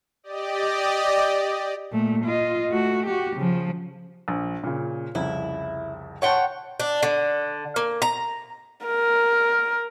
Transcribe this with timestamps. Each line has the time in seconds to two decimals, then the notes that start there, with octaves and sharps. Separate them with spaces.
0.23 G4 D5 D#5
1.92 A#2 A3
2.24 F4 D#5
2.71 A3 F#4
3.07 F#4 G4
3.36 C#3 F3
4.28 A#1
4.63 A#2 C#3
5.15 C2 F2 C#3 E4
6.22 C#5 F#5 G5 A5 C6 C#6
6.80 D4
7.03 D3
7.76 A#3
8.02 A#5
8.86 A#4